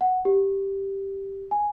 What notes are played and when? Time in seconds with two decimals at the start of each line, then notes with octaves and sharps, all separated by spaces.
0.01 F#5
0.25 G4
1.51 G#5